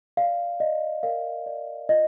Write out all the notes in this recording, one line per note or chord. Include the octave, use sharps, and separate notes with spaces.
D5 F5
D5 D#5
A#4 F5
D5
F4 D#5